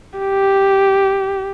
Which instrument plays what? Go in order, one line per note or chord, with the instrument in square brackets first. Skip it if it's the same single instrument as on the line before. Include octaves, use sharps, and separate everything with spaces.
[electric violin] G4